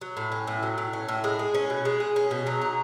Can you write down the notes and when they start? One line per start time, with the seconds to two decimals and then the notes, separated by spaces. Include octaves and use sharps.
0.01 F#3
0.17 A2
0.32 C#4
0.47 A2
0.63 F#3
0.78 A2
0.93 C#4
1.08 A2
1.24 G#3
1.39 G#4
1.54 C#4
1.70 B2
1.85 G#3
2.00 G#4
2.16 C#4
2.31 B2
2.47 F#3
2.62 D#4